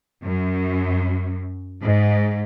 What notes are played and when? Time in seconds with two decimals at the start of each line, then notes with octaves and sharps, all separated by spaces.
0.24 F#2
1.81 G#2